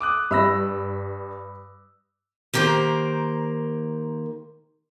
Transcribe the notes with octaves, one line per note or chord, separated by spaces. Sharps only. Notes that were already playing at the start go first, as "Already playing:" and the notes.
D6 D#6 F#6
G2 B5 E6 A#6
D#3 A#3 G4 A#4 C5